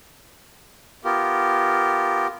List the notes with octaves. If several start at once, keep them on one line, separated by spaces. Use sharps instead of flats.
B3 F4 G4 A#4